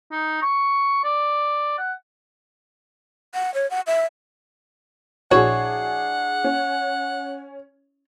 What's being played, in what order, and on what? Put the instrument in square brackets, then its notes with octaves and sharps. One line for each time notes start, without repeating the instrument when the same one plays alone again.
[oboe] D#4
C#6
D5
F#5
[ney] F#5
C#5
F#5
E5
[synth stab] A#1 F#4 [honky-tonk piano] D4 G#4 [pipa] E4 C#5 [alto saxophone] F#5
[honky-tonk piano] C#4